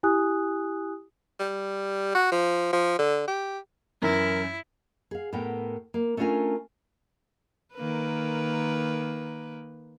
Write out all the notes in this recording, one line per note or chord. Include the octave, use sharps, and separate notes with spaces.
E4 G4 G#5 D#6 F#6
G3
F#4
F3
F3
D3
G4
F#2 E3 E4 A#4
G#4 F5
A2 B3 A#4 G5
A#3
A3 C#4 D4 F4 A#4 G#5
D#3 A#3 B4